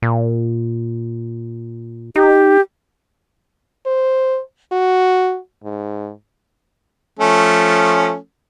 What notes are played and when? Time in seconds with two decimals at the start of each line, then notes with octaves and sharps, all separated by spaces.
0.02 A#2
2.16 D#4 G4
3.86 C5
4.72 F#4
5.64 G#2
7.20 F3 A3 C#4